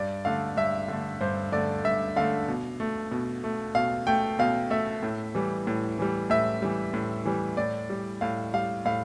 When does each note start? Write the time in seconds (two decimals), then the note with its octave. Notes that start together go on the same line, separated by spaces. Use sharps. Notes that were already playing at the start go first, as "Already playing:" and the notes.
Already playing: G2 D5
0.25 D3 A3 F5
0.57 G2 E5
0.88 D3 A3
1.21 G2 C5
1.52 D3 A3 D5
1.84 G2 E5
2.16 D3 A3 F5
2.48 B2
2.80 A3
3.11 B2
3.44 A3
3.75 B2 F5
4.07 A3 G5
4.39 B2 F5
4.70 A3 E5
5.03 A2
5.35 E3 G3
5.67 A2
5.99 E3 G3
6.30 A2 E5
6.62 E3 G3
6.94 A2
7.26 E3 G3
7.57 A2 D5
7.90 G3
8.21 A2 F5
8.54 G3 F5
8.85 A2 F5